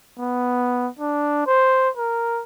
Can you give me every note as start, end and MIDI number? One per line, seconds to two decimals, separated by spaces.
0.19 0.88 59
0.99 1.45 62
1.47 1.89 72
1.97 2.42 70